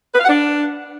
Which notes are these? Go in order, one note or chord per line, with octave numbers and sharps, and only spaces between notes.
B4
F5
F#5
D4